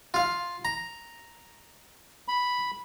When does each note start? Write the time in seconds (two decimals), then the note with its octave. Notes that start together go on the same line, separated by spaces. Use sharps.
0.14 F4 F5
0.65 A#5
2.28 B5